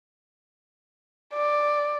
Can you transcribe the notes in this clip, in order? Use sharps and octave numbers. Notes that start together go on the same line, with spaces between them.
D5